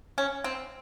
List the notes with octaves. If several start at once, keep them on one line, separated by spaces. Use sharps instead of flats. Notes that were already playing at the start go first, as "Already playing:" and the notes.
C#4
C4